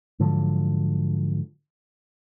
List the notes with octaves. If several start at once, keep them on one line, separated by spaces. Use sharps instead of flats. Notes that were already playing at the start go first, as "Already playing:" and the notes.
G#2 D3 F3 F#3